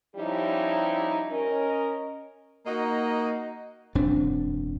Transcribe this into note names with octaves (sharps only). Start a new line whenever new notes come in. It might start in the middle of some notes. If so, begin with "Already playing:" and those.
F3 G3 C#4 D#4 E4 G4
C#4 A#4 D#5
A#3 D#4 F#4 D#5
E1 F#2 C4 D4